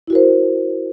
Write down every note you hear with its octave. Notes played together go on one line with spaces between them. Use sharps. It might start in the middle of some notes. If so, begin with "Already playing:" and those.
E4 F#4 A#4 C5